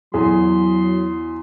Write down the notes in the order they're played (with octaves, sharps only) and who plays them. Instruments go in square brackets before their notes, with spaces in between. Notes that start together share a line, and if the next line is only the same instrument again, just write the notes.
[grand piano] E2 G#4 [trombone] F#3 [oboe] C6